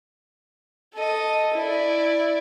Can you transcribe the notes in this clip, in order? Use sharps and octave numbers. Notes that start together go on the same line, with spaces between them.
A4 D#5
E4 D5